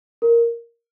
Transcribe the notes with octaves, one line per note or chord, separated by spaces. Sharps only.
A#4